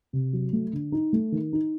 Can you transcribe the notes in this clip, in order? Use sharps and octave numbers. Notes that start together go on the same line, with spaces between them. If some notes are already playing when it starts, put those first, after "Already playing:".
C3
F#3
A3
D3
D#4
A3
D#3
D#4